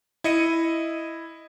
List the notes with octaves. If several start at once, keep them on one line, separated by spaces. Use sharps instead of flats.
E4 D#5 C#7 D#7